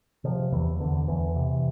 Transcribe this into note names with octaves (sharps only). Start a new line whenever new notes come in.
C3 F3
E2 E3
E2 D3
E2 E3
C3